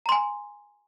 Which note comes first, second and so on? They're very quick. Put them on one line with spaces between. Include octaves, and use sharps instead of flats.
A#5 C6 G#5